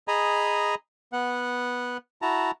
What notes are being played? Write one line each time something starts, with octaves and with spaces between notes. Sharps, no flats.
G#4 D#5 G#5 A#5 B5
B3 F#5
E4 F#4 A5 A#5